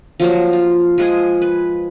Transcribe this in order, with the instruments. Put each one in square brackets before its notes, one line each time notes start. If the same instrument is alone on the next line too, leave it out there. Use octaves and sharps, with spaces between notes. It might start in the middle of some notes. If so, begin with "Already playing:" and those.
[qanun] F3 F#3 A#3
F4
F3 G#3 G#4
B4